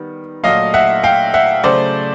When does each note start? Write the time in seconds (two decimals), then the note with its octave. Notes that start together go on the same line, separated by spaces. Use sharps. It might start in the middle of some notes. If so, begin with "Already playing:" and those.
Already playing: D#3 G3 B3
0.44 A#2 F#3 A3 D#5 F5
0.74 E5 F#5
1.04 F5 G5
1.34 E5 F#5
1.64 C#3 F#3 A3 C5 D5